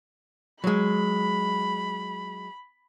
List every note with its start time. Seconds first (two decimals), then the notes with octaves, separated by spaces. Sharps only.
0.64 F#3 G#3 B5